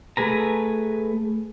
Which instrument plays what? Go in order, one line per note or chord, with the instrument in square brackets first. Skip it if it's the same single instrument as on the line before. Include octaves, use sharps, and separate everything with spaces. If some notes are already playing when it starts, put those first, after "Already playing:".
[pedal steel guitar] A3 G#4 B4 A#5